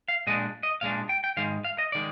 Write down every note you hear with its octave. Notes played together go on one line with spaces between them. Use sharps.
F5
A#2 G#3 D4 D#5
D#5
A#2 G#3 D4 F5
G5
G5
G#2 D#3 G#3 F5
F5
D#5
D#3 G#3 D5